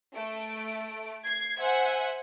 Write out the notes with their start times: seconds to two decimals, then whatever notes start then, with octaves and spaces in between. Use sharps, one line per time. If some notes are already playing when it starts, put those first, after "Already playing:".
0.15 A3 D7
1.25 G#6 C7
1.59 C5 E5 F#5 G#5